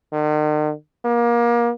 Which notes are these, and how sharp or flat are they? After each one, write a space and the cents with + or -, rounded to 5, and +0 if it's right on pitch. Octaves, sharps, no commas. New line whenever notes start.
D#3 -45
A#3 +30